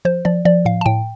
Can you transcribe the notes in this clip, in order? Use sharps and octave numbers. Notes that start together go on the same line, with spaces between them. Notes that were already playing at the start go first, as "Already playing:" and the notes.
F3 C5
F3 D5
F3 D5
A2 F5
A5
A2 G5